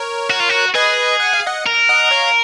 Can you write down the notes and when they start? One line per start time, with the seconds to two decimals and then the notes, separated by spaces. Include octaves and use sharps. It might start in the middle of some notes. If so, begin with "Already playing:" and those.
Already playing: A#4 C#5
0.30 F#4
0.40 F4
0.49 F#4
0.75 G#4 B4 D#5
1.20 F#5
1.33 F5
1.46 D#5 F#5
1.66 A#4
1.89 D#5 F#5
2.11 C#5 F5